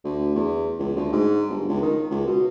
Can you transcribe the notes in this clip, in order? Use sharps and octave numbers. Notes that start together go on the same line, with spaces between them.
D2
E2
C#2
D2
G#2
G1
C#2
D#3
C#2
B2